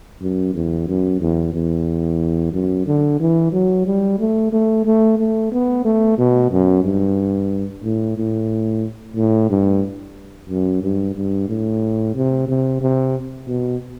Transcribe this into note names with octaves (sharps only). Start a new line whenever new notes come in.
F#2
E2
F#2
E2
E2
F#2
D3
E3
F#3
G3
A3
A3
A3
A3
B3
A3
B2
F#2
G2
A2
A2
A2
G2
F#2
G2
G2
A2
C3
C3
C3
B2